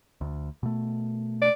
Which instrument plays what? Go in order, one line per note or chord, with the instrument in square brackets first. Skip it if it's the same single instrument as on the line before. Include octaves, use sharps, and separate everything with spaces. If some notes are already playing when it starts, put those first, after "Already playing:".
[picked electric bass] D2
B2 A3
[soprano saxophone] D5